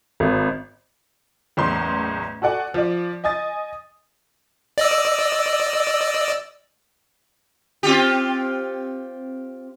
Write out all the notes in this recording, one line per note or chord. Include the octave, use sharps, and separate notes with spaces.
G#1
F#1 E2 A2 C6
F#4 A4 D5 F#5 G#5
F3 D5
D#5 G#5 D#6 A6
D5 D#5 E6
C4 F4 G4